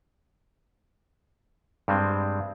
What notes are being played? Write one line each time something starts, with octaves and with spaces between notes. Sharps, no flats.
G2 G3 G#3 C4